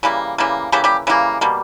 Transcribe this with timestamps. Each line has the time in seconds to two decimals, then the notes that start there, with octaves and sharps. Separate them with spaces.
0.03 C#3 E3 G3 A#3
0.38 C#3 E3 G3 A#3
0.72 C#3 E3 G3 A#3 G4
0.84 G3 G4
1.07 C#3 E3 G3 A#3
1.41 B2 G3 A#3